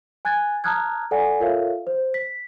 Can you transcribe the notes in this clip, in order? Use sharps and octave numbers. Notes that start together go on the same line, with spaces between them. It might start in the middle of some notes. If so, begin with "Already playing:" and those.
G#5 F#6 G#6 A6
A5 A#5 D#6 F6 F#6 G#6
A4 D5 F#5 G#5
F4 A4 A#4 C#5 E5 F5
C5
B6